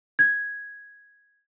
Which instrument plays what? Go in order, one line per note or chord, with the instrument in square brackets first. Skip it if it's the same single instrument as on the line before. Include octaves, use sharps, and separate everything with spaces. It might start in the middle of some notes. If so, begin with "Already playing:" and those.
[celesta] G#6